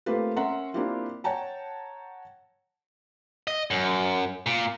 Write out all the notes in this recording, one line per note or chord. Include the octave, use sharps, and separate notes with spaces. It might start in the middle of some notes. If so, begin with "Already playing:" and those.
A3 A#3 C4 F4 G4 B4
C#4 A#4 E5 F#5 A#5 C6
A#3 C4 D4 E4 F4 G4
C#5 F#5 G5 A5 A#5
D#5
F#2
A#2